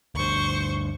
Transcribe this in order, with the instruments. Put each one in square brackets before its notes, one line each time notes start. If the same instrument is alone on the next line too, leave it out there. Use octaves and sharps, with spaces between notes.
[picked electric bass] D2 G2 [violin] C5 C#6